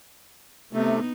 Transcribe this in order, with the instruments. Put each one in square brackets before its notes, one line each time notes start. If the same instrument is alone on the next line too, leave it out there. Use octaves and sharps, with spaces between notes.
[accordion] C3 A3 [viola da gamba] B3 D#4